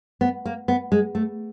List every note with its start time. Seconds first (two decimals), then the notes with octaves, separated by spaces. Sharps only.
0.21 B3
0.45 A#3
0.68 B3
0.92 G#3
1.15 A3